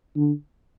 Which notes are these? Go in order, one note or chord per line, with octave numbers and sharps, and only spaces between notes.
D3